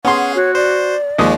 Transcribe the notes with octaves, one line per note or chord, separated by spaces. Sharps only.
B3 C#4 G#4 F#5 C6
F#4 C#5
C5 D5
D#2 F3 G#3 C#6 D#6